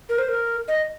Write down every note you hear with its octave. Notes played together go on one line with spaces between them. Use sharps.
A#4
C5
A#4
D#5